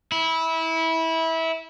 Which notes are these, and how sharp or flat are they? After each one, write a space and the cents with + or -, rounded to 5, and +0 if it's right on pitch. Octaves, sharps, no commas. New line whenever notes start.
E4 -20